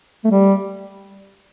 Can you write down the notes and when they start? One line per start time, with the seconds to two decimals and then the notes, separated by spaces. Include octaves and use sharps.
0.25 A3
0.31 G3